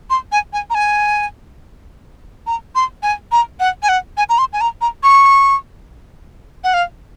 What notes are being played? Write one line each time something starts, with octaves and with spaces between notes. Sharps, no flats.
C6
G#5
G#5
A#5
G#5
A#5
C6
G#5
A#5
F#5
G#5
F#5
G#5
A#5
C6
G#5
A#5
A#5
C#6
F#5
F5